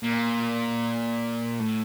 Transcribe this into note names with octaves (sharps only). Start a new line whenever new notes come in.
A#2
A2